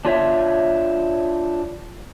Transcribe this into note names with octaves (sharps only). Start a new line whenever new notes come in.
D4 F4 C#5 E5